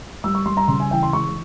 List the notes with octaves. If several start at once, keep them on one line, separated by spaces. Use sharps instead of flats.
G3 E6
C#6
G3 C6
A#5
C#3 C6
G#5
E3 G5
C6
G#3 C#6